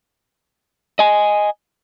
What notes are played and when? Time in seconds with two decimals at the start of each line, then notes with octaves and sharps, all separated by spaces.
0.99 D#5 G#5